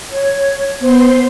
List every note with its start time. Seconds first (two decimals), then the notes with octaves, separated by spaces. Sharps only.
0.12 C#5
0.80 B3 C5 C6